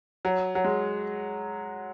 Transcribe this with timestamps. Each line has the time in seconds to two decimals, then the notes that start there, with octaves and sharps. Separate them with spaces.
0.25 F#3
0.55 F#3
0.64 G#3